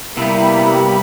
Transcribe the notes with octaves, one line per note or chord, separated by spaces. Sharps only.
C3 G3 A#3 B3 E4 G4 B5